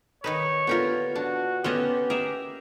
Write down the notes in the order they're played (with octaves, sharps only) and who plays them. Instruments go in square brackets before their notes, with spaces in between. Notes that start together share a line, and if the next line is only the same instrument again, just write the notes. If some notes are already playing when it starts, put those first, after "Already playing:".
[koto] D#3 D#4 B4 [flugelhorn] C#5
[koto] D3 G4 A#4 [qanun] B3 F4
[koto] D4 [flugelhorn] F#4
[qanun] B3 C#4 A4 [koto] F4 C#5 D#5 [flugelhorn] G4
[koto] G#4 [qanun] A#4 E5